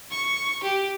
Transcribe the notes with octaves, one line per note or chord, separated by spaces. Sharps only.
C#6
G4